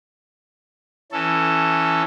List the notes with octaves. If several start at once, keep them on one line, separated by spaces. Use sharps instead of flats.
E3 C#4 A4